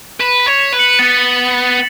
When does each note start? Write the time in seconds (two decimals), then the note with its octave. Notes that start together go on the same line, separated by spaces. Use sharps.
0.20 B4 B6 E7
0.40 B6
0.47 C#5
0.59 B6 E7
0.73 B4
0.79 C#7 F#7
0.98 B3 A6 C#7